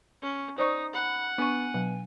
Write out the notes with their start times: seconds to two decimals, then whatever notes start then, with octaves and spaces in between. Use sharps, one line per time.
0.22 C#4
0.58 D#4 C5 D5 C#6 D#6
0.94 F#5 B5
1.38 B3 D4 G#5 C#6
1.74 B2 F#3